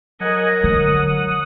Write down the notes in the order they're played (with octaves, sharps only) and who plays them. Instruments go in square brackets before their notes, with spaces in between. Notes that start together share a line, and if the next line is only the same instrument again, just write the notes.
[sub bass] F#3 [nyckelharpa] A#4 [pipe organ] D#5 F#5 G#5
[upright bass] D3 [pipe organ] F#5 D#6